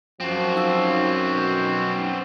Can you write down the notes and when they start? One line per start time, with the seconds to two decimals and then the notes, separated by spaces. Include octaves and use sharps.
0.20 F#2 F3 C4 F#4
0.55 D#4 E6
1.33 B2